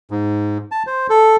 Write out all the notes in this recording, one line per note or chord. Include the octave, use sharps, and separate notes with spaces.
G#2
A5
C5
A4